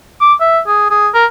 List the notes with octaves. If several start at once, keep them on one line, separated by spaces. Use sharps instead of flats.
D6
E5
G#4
G#4
A#4